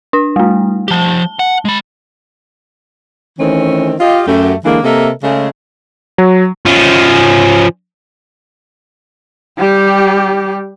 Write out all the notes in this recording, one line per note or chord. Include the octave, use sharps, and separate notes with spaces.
D4
G3 A3
F3 G4 A5 G7
F#5
G#3 B5
D#3 E3 A3 C4 C#4
F4 G4 D#5
F#2 A3 G4
D3 E3 G#3 A#3
C3 A#3 A4 A#4 D#5 E5
C#3 G#3 A3
F#3
F3 C#4
G3 G4